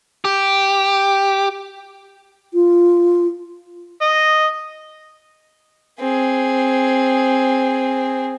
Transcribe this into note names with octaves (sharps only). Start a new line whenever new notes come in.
G4
F4
D#5
C4 G#4